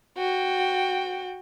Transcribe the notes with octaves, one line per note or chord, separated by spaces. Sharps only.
F#4 G5